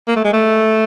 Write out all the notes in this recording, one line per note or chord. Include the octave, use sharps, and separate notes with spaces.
A#3
A3
G#3
A3